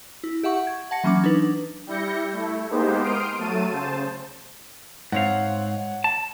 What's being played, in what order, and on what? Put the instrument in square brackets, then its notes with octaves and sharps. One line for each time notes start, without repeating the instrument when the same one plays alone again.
[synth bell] E4
G4 E5 F#5 C#6
G#6
F#5 A5 A#6 C#7
E3 F#3 A#3 C#4 D6
D4 D#4 B4
[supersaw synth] G3 E4 G6 A#6 C#7
A3 E4
G#3 A#3 B3 D#4 G4 C5
C6 D#6 F6 D7
F#3 A3 A5 D#7
C#3 C5 A5
[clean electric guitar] G#2 C4 F5 [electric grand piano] C#5 F#5
[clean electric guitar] A5